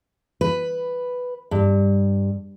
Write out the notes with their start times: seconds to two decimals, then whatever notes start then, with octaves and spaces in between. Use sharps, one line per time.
0.41 B4
1.51 G2